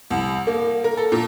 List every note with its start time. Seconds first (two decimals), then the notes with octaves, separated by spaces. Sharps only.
0.10 C2
0.47 A#3
0.84 A#4
0.97 A4
1.12 A#2